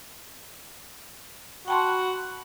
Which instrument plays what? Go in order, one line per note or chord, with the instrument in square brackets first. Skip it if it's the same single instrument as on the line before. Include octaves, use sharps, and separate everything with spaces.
[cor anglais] F#4 [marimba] G5 A5 C6 [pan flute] B5